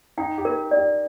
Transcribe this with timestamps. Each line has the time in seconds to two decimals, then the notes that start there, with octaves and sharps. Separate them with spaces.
0.18 D#4 G5
0.38 G4
0.45 A#4
0.71 D5
0.77 G4